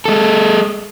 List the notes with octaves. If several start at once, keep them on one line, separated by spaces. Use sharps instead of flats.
G#3 A4